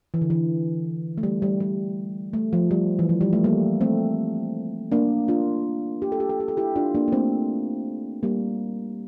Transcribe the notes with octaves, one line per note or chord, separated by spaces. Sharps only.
E3
D3
E3
A3
G3
G3
G3
A3
F3
G3
E3
F3
G3
A3
G3 A#3
A3 C4
A#3 D4
D4 F4
G4
A4
G4
A4
G4
A4
E4 G4
D4 F4
A#3 D4
A#3
A3 C4
G3 A#3